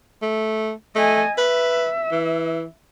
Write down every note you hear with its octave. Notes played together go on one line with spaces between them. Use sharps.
A3
A3 D#5 G#5
B4 E5
E3